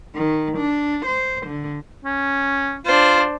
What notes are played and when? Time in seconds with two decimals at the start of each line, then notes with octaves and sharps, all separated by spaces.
0.14 D#3
0.56 D4
1.05 C5
1.46 D3
2.05 C#4
2.86 D4 F4 C5